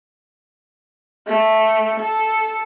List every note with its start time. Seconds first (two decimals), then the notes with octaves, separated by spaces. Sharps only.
1.27 A3
2.00 A4